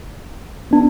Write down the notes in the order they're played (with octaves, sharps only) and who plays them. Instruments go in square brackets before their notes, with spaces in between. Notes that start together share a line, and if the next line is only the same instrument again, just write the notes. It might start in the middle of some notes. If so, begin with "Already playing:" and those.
[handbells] B3 D4